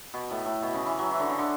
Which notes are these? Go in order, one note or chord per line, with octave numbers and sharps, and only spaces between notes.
B2
A2
A2
B2
C#3
E3
F#3
E3
D3
C#3
D3